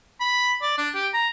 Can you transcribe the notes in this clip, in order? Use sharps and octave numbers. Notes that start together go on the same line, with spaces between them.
B5
D5
D4
G4
A#5